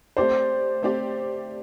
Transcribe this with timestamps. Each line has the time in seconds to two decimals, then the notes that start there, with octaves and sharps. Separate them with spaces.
0.17 A3 C4 G4 C5 D5
0.83 A3 C4 G4 D5